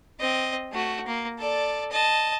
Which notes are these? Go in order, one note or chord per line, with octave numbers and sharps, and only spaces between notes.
C4 D#5
A3 F#4
A#3
A4 D5
D#5 A5